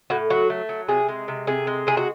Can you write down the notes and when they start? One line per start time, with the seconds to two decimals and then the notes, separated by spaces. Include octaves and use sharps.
0.10 A2 F#4
0.30 F#3 F#4
0.50 A3
0.69 F#3
0.89 C3 G#4
1.08 G#3
1.28 C3
1.47 C3 G#4
1.67 G#3
1.87 C3 G#4
1.97 F#4